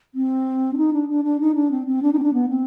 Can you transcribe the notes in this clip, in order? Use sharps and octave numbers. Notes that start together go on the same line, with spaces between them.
C4
D4
D#4
D4
D4
D4
D#4
D4
C4
C4
D4
D#4
C4
D4
B3
C4